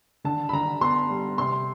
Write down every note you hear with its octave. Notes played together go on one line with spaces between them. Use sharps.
D3 A5
B5
D3 A#5
B3 C6
G3
C3 C6